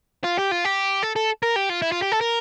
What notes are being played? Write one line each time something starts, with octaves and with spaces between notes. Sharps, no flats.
F4
G4
F4
G4
A4
A4
A#4
G4
F4
E4
F4
G4
A4
A#4